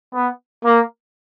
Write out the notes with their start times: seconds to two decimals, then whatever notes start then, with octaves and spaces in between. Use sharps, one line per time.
0.12 B3
0.64 A#3